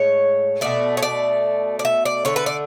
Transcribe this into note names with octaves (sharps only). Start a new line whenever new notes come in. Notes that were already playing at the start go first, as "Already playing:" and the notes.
Already playing: A2 G#3 C#5
B2 A3 D5
C#5
D5
D5
E5
D5
D3 A3 C#5
B4
D5